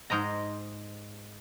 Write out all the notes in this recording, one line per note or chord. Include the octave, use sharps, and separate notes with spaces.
G#2 C5 D#5 A#5